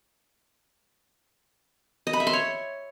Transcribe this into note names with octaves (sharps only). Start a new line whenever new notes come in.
D#5
B5
E5
C6
C#5